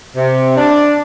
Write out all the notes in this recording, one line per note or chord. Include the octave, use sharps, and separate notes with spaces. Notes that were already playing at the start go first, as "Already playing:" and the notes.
C3
D4